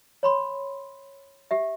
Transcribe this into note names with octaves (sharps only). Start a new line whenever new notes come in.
C#5 B5 C6
G4 E5